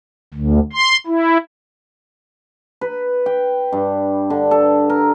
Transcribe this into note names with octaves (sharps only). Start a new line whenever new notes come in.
D2
C6
E4
B4
G5
G2
D3
A4
A#4